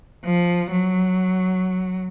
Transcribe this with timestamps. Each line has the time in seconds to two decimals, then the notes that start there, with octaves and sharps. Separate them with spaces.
0.25 F3
0.71 F#3